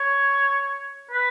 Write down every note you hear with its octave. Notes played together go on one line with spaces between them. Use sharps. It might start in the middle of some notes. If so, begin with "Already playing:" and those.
Already playing: C#5
B4